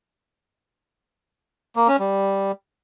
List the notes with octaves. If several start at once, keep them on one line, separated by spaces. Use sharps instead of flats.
A#3
C#4
G3